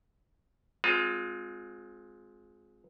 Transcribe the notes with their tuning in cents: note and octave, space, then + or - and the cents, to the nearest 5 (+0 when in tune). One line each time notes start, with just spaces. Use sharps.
G#3 +10 C4 +0 F4 +30